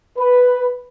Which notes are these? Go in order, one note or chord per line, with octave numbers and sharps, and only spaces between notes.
B4